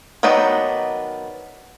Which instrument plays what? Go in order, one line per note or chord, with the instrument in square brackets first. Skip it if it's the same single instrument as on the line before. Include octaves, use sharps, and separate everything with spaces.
[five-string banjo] D#3 F#3 B3 D4 D#4